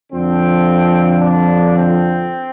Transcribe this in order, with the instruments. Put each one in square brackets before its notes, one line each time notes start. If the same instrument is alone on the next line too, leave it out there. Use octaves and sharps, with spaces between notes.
[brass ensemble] F2 D3 F3 C4
D4
C4